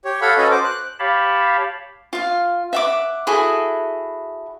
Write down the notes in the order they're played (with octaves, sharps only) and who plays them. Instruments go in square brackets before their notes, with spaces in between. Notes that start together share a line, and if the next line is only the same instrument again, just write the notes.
[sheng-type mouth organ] G4 C#5
A4 C#5 F5 F#5 B5
C#4 F#4 A4 B4 D#5
C5 D6
F#6
[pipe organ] G4 C#5 F5 A5 B5
[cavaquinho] F4 F5
E5 F#5 D6
E4 F#4 G#4 A4